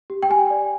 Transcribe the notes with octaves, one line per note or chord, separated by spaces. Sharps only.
G4
G5
G4 G#5
D5